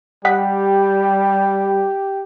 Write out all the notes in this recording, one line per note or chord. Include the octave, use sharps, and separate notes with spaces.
G3 G4 D#5 F#5 B6